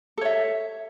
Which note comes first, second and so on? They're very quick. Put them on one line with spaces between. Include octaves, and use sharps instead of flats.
A4 C#5 E5